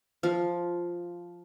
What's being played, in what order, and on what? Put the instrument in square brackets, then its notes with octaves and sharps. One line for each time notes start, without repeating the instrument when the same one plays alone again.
[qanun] F3